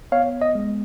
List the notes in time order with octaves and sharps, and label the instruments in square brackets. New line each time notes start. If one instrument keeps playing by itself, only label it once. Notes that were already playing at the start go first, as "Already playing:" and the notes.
[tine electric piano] B3 C#5 F5
D#5
G#3